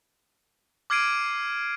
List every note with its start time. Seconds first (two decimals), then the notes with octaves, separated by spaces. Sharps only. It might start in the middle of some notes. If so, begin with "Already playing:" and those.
0.90 D6 F6 G#6 C7 D7 D#7